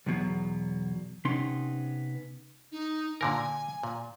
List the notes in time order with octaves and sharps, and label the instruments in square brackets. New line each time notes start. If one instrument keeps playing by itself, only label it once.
[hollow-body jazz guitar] B1 E2 B2 F#3
C3 B3 C#4 D#4 C6
[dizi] D#4
[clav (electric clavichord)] A#2 D3 A#4 [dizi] G#5
[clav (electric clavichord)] A#2